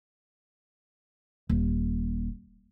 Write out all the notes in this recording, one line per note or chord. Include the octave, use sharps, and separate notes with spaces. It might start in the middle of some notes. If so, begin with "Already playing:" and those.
D#1